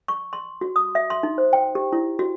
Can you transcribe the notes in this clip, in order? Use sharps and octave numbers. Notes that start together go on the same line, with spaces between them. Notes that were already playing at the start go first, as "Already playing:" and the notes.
C#6
C6
F#4
D#6
E5
C6
D#4
C5
G5
G4
E4
F#4